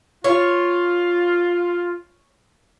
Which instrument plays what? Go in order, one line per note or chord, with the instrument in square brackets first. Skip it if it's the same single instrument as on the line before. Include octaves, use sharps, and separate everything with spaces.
[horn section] F4 [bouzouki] C#5